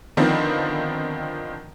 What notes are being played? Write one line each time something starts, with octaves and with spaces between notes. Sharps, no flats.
D3 D#3 F3 B3 C4